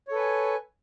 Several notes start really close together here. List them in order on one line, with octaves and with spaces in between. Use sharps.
C#5 A4 B4 G#5